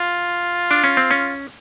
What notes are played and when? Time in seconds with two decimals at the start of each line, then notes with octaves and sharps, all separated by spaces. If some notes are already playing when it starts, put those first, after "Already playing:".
Already playing: F4
0.71 D4
0.84 C#4
0.97 C4
1.11 C#4